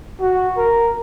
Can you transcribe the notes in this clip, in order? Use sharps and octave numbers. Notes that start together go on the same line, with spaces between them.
F#4
A#4